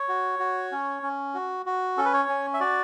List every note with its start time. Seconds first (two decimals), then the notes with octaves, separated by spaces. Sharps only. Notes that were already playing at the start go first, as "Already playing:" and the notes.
Already playing: C#5
0.08 F#4
0.39 F#4
0.72 C#4
1.03 C#4
1.34 F#4
1.66 F#4
1.97 C#4 A4
2.05 B4
2.13 C#5
2.29 C#4
2.54 E5
2.60 F#4 D5